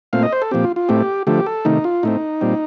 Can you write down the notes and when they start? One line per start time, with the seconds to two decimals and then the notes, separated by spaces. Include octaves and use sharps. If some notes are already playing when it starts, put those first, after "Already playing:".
0.13 A#2 A3 C4 F5
0.23 D#5
0.32 C5
0.42 A4
0.51 A#2 F3 C4 G4
0.64 F4
0.76 F4
0.89 A2 A3 C4 G4
1.27 D3 F3 A3 G4
1.46 A4
1.65 C3 D#3 A3 D#4
1.84 F4
2.03 A2 A3 C4 D#4
2.41 A#2 G3 C4